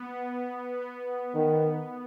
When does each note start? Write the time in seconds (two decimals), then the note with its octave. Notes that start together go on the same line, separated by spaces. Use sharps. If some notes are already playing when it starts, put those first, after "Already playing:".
Already playing: B3
0.80 B3
1.35 D#3